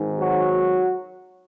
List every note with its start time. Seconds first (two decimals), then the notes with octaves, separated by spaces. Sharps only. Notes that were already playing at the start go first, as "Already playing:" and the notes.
Already playing: G#1 G#2 D#3
0.18 F#3 F#4